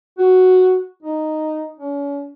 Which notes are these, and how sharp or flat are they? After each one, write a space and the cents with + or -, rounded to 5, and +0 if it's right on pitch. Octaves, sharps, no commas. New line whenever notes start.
F#4 +0
D#4 -5
C#4 +40